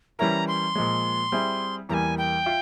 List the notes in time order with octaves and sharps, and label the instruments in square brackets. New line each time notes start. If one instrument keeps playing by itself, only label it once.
[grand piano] E3 G3 C#4 E4 A#4 [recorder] A#5
[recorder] C6
[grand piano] A#2 F3 G#3
G3 C4 E4 G#4
[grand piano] E2 E3 G3 A#3 [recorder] G#5 A#5
[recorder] G5
[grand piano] F4 E5